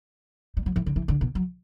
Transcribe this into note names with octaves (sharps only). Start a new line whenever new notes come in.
G3
F#3
E3
D3
E3
D3
B2
F#3